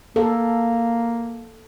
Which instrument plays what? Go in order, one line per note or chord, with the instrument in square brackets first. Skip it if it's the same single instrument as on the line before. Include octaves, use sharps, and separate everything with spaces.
[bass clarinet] A#3 [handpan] A4